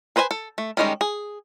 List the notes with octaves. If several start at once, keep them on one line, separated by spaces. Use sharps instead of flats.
G#4 B4 C5 D5 G#5
A4
A3
D#3 G3 G#3 C#4 D#4
G#4